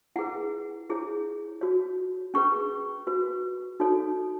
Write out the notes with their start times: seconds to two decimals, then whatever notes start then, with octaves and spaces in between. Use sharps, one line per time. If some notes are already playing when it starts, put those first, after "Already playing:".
0.16 E4 G#4 B4 F#5
0.89 E4 G#4 C#5
1.61 F#4 C#5
2.34 C#4 G#4 B4 C#6
3.07 F#4 B4
3.80 D#4 F#4 A4 C#5